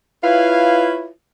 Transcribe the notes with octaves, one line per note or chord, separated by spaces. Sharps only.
E4 F4 B4 C#5 F5